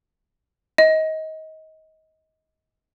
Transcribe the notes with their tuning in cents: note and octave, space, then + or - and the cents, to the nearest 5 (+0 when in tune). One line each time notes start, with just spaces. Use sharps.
D#5 +25